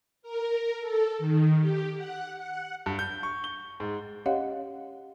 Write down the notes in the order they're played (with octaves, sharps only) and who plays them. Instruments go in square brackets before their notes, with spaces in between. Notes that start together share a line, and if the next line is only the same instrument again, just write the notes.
[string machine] A#4
A4
D#3
G4
F#5
F#5
[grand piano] G2
G6
C#6
G7
G#2
[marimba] C#4 G4 C#5 D#5 F5 F#5